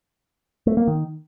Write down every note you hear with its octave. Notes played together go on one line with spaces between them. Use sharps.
A3
A#3
D#3